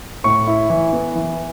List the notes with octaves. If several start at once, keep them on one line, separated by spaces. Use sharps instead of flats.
A2 C#6
E4
E3
B3
E3